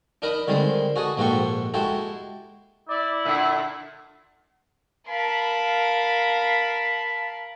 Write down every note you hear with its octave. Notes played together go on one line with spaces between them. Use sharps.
D4 D#4 A#4 D#5 B5
D3 D#3 G3 G#3 C4
F#4 G#4 A4 D#5
A#1 G#2 F#4 G4 A4 C#6
G#3 E4 F#4 G4 A4
E4 D5
A#2 D3 E5
A#4 F5 A5 B5